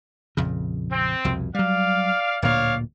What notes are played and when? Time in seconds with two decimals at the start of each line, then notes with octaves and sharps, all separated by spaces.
0.37 A#1 F2 C#3
0.92 C4
1.24 C2 F2 B2
1.55 F#3 G3 D5 F5
2.42 D1 D2 A#2 C#5 D5 F5